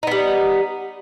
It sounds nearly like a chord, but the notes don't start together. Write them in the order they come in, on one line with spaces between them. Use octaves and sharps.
D#4 B3 G3